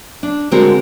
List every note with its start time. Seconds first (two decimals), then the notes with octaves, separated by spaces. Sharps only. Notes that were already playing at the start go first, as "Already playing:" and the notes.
0.23 D4
0.51 D3 G#3 C4 F#4 A#4